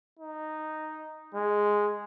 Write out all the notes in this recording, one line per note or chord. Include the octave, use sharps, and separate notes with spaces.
D#4
G#3